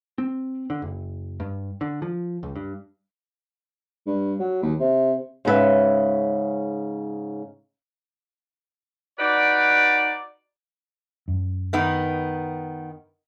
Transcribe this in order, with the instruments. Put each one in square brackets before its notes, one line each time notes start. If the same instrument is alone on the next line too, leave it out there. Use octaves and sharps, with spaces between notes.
[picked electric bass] C4
D3
F#1
G2
D3
F3
C#2
G2
[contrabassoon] G2
F#3
D#2
C3
[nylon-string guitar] G#2 C#3 C#4 F#4 B4 E5
[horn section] D#4 F#4 B4 D5
[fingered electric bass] F#2
[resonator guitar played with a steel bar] D#3 B3 D#4